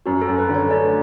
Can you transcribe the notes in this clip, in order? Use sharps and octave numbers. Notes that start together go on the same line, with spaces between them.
F#2 F#4
A4
F#2
B4
D3
C#5
A3 D5